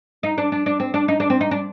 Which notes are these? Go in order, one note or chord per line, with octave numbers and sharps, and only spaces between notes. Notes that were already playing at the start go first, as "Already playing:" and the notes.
D#4
D4
D4
D4
C4
D4
D#4
D4
C4
D#4
D4